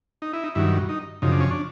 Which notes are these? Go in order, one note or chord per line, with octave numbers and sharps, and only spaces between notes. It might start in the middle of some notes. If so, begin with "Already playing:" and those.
D#4
E4
D#4
G2 D#3 F#3 E4
D#4
F#2 C#3 F3 D#4
D4
C#4
D4